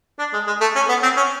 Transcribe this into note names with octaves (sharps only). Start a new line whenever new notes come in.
D4
G#3
G#3
A3
C#4
B3
C4
C#4